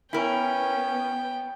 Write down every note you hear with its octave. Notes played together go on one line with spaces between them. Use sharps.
B3 C#4 E4 A#4 G5